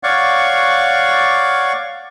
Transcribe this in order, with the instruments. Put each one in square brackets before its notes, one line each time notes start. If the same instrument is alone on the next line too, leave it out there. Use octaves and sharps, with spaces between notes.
[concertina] C#5 D5 F5 F#5 C#6